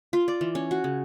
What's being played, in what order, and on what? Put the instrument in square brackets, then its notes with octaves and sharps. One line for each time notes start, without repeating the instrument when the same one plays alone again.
[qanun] F4
D5
E3
C#4
F#4
C#3